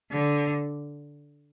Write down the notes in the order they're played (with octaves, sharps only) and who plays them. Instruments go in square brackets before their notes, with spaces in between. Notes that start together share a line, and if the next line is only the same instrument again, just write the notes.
[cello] D3